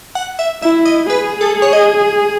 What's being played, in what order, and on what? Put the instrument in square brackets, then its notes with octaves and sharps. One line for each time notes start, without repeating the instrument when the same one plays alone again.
[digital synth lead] F#5
E5
[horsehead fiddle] E4 [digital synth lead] E5
[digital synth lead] D#5
[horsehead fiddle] G#4 [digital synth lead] B4
[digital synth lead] A4
C#5
D#5